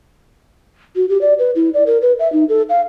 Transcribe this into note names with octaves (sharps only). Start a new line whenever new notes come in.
F#4
G4
D5
B4
E4
D5
A#4
B4
E5
D#4
A4
F5